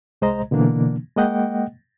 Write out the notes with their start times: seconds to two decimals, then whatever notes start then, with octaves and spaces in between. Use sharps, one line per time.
0.22 C2 G#3 C5 D#5 A#5
0.51 B2 D3 E3 A#3 D4
1.17 G#3 A#3 D#5 F#5 G5